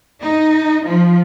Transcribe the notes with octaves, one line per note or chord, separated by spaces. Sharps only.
D#4
F3